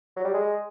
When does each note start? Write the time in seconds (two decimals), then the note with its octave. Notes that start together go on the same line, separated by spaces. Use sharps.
0.17 F#3
0.25 G3
0.34 G#3